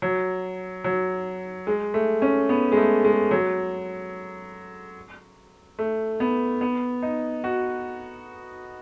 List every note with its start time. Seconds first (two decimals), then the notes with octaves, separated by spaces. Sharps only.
0.02 F#3
0.84 F#3
1.67 G#3
1.94 A3
2.22 C#4
2.49 B3
2.72 G#3
2.77 A3
3.05 G#3
3.31 F#3
5.79 A3
6.20 B3
6.61 B3
7.02 D#4
7.44 F#4